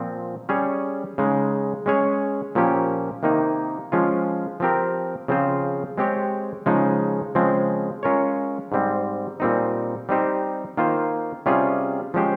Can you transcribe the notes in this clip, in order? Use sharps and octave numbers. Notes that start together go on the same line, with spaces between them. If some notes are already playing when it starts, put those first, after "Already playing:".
Already playing: A#2 F3 C4
G3 C#4 G#4 C#5
C#3 G#3 D#4
G#3 C#4 G#4 C#5
A#2 F3 A#3 C#4 G4
C3 D#3 A#3 D#4
F3 G#3 C#4 F4
F3 C4 G4 A#4
C#3 F3 C4 F4 C5
G#3 C4 G4 C#5
C#3 F3 G#3 D#4
C#3 F3 G#3 C4
G#3 C#4 F4 A#4 C#5
G#2 G3 C4
A#2 G3 C4 D#4
G3 C4 D#4 G4 C5
D#3 A#3 F4 C5
C3 G3 C#4 F4 G#4
F3 G#3 C#4 G4 C5